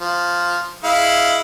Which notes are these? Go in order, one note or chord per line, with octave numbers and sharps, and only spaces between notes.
F3
G#3 E4 F5